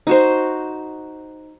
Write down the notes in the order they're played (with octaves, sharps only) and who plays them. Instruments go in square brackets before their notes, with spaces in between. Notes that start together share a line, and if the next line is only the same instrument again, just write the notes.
[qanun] D#4 F#4 C5